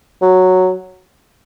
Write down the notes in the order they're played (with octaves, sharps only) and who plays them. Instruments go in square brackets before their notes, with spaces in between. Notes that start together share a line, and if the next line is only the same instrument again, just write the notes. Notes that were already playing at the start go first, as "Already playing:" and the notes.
[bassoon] F#3